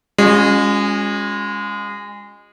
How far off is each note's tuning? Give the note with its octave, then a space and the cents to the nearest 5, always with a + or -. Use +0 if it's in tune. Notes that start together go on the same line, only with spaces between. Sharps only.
G#3 -25 C#4 +0 F4 +35